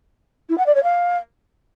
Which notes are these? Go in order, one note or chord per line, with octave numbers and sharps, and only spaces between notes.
E4
F#5
D5
C#5
F5